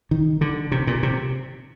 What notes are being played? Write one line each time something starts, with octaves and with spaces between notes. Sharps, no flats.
D#3
D3
C3
A#2
C3